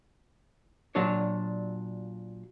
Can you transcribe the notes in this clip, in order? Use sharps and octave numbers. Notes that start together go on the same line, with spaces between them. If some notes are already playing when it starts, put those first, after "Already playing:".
A#2 F#3 D4 C#5